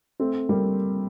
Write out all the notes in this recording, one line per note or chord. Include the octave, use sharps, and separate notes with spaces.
A3 C4
G3 A#3